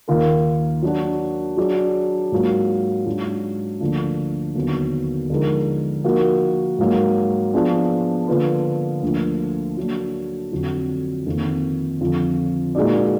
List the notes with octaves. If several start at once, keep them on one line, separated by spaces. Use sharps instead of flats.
D#2 D#3 A#3 F4 A#4
F#3 D4 F#4
F#3 D4 G#4 D5
G#2 F#3 A#3 F4
G#2 F#3 D4 F4
D2 D3 F3 A#3 D4
D#2 D3 F#3 B3
D3 F3 G#3 D#4 A#4
F3 A#3 D#4 F#4 A#4
G#2 F#3 A#3
F3 B3 D4 G#4
D3 F3 A#3 F4 B4
D2 D3 F3 A#3
F#3 A#3 D4
F2 D3 F#3
F2 D#3 A#3
F2 D3 F3
A#2 G#3 D#4 F#4 D5